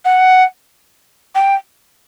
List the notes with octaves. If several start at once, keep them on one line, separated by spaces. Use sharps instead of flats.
F#5
G5